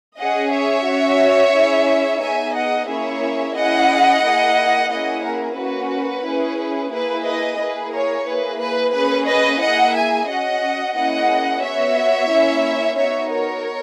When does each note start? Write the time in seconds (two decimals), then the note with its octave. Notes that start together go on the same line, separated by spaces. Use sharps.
0.19 C#4 G#4 D#5 F#5
0.53 C#5 E5
0.87 C#4 F#4
1.54 C#4 E4 G#4
2.21 B3 D#4 G#4 E5 G#5
2.55 D#5 F#5
2.88 A#3 C#4 E4 G#4 C#5 E5
3.56 C#4 E4 G#4 D#5 F#5
4.24 A#3 E4 G#4
4.90 A#3 C#4 E4 G#4 D#5 F#5
5.24 A#4
5.58 A#3 C#4 F#4 B4
6.25 C#4 E4 G#4
6.92 A#3 E4 G#4 B4
7.26 B4 D#5
7.59 A#3 E4 G#4 B4
7.93 A#4 C#5
8.27 A#3 E4 G#4 B4
8.61 B4
8.94 A#3 C#4 G#4 B4
9.28 B4 D#5
9.61 A#3 E4 G#4 D#5 F#5
9.95 E5 G#5
10.29 C#4 F#4 D#5 F#5
10.97 A#3 C#4 E4 G#4 D#5 F#5
11.63 B3 F#4 C#5 E5
12.31 A#3 C#4 E4
12.98 B3 D#4 F#4 C#5 E5
13.31 A#4 C#5